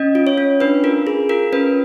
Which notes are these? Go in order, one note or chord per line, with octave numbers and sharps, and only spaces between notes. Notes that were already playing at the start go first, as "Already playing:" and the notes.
Already playing: C#4 D#5
F4
C#5
C#4
D4 B4
F4 A#4
G#4
F4 A#4
C#4 B4